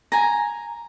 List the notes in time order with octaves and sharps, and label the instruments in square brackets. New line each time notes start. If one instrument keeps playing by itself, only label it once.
[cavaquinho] G#5 A#5